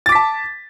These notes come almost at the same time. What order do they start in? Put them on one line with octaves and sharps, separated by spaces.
A6 D6 B6 A5